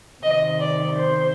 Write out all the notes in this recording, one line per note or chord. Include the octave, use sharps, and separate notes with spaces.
C3 D#3 D#5
D5
C5